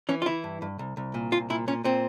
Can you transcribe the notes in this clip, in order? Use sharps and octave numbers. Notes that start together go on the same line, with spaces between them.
E3 C#4
F4
E3 E4
G2
G2
C2
C2
A#2
C2 F4
A#2 E4
A#2 C#4
A#2 C4